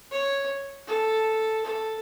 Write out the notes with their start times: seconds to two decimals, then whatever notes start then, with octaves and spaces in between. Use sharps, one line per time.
0.11 C#5
0.87 A4
1.64 A4